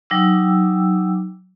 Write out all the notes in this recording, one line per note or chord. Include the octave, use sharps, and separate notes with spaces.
F#3 D#4 G5 D6 E6